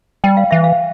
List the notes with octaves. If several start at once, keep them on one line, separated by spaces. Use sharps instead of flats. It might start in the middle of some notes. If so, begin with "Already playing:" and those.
G3 G5
F5
E3 E5
F5